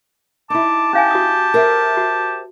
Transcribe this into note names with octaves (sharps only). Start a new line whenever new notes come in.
D#4 E4 A5 D6
C#4 G4 F5 G#5
F#4 D#6
A#4 C5 E5
F#4